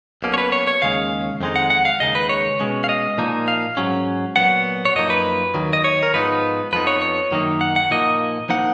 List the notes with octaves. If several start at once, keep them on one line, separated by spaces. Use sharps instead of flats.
B1 B2 A#3 C#4
C#5
B4
C#5
C#5
D#2 C#3 G#3 C#4 F5
F2 D#3 G#3 D#4
F#5
F#5
F5
D#2 C#3 G#3 D#4 D#5
B4
C#5
B2 G#3 C#4
F5
D#5
A#2 F3 A#3 D#4
F5
G#2 F#3 C#4
A#2 F#3 B3 F#5
C#5
F#2 F3 A#3 D#4 D#5
B4
D#2 D#3 F#3
D#5
C#5
A#4
G#2 F3 B3 D#4 B4
F2 F3 B3 D#4 B4
C#5
C#5
F#2 D#3 A#3 D#4
F#5
F#5
A#2 F3 A#3 D#4 D#5
F3 A#3 D#4 F#5